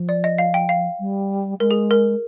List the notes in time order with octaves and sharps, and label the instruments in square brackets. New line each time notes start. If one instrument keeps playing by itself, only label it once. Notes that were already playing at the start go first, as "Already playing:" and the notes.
Already playing: [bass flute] F3
[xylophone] D5
D#5
F5
G5
F5
[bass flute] G3
[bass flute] G#3 [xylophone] A#4
[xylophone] G#4
A#4